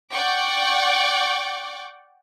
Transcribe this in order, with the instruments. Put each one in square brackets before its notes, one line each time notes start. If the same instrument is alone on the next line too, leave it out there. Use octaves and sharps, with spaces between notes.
[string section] D5 F#5 G5 C#6 D6